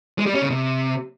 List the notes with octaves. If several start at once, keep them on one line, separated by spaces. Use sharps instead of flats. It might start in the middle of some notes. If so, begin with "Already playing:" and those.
G#3
G3
C#4
C#3
C3